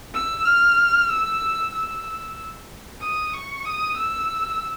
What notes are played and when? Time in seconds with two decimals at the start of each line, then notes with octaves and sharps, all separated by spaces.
0.14 E6
0.46 F6
1.09 E6
1.73 E6
3.01 D#6
3.33 C#6
3.65 D#6
3.97 E6